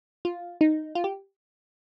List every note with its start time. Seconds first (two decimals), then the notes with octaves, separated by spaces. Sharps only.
0.25 F4
0.61 D#4
0.95 F4
1.04 G4